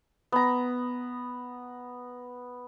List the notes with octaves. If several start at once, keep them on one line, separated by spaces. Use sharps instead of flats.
B3 A#5